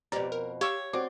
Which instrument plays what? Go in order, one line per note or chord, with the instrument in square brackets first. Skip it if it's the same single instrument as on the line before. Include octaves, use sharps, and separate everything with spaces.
[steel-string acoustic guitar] F2 B2 [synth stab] G4 D5 [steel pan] A#5
[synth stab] A#4
[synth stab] G4 [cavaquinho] C#5 [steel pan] F5 C#6 E6
[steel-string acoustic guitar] C4 [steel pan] F#4 D5 D6